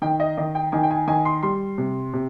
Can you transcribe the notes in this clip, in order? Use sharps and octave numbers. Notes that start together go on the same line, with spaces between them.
D#3 G5
D#5
D#3 D#5
G5
D#3 G#5
G5
G#5
D#3 G#5
C6
G3 C6
C3
C3